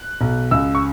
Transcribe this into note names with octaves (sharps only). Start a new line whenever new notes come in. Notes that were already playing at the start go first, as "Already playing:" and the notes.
Already playing: F#6
B1
C#2 E6
C#6